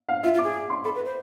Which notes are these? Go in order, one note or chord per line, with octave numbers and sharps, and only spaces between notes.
F5
F4 E5
F4
D6
G#4
C6
A4 B5
B4
C5